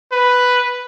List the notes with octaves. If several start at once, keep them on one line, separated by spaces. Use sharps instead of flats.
B4